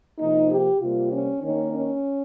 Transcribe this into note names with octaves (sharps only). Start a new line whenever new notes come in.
C3 F3 A#3 D#4
G4
C3 G3 A#3 F4
C#4
D#3 A#3 C#4
C#4